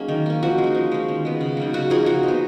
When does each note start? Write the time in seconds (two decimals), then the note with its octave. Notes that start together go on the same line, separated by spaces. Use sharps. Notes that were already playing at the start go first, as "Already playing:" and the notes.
Already playing: F#3 A#3 C#4 D#4 G#4
0.08 D#3
0.26 A#3 C#4
0.43 F3 F#4
0.58 G#3
0.64 D#4
0.74 F3
0.92 G#3 C#4
1.08 D#3
1.25 G#3 B3
1.41 C#3
1.57 F#3 A#3 D#4
1.73 C#3 F#4
1.90 F3 A#3 D#4 G#4
2.06 F3 F#4
2.23 D#4
2.28 B3